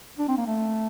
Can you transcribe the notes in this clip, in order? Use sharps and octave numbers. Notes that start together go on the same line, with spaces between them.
D4
C4
A#3
A3